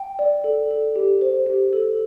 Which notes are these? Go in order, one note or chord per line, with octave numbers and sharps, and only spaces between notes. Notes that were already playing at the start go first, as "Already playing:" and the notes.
Already playing: G5
D5
A4
A4
G4
C5
G4
A4